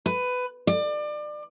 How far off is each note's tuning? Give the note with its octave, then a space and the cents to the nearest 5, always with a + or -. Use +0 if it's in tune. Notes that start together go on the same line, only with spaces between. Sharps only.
B4 +15
D5 +30